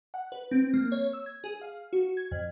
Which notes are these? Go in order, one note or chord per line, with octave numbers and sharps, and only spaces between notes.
F#5
B4
C4
A#3
C#5
E6
G#6
G#4
F5
F#4
G#6
F2